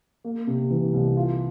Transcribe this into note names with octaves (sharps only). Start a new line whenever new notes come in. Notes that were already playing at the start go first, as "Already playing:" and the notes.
A#3
C3
E3
C2
F4